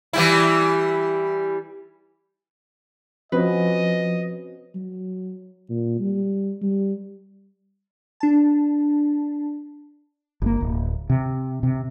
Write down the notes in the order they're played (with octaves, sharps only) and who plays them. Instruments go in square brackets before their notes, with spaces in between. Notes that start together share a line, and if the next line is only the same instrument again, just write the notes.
[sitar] E3 G3 E4
[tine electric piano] F3 [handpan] C4 C#4 F#4 [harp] B4 [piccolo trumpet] D#5
[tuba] F#3
A#2
G3
G3
[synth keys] D4 A5
[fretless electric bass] G1 C3 A#3
D1
C3
C3